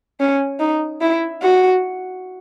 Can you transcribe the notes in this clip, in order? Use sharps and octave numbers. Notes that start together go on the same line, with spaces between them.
C#4
D#4
E4
F#4